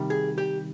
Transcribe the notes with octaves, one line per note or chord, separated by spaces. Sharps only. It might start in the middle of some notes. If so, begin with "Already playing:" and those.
Already playing: C3 D#3 G3
G#4
G4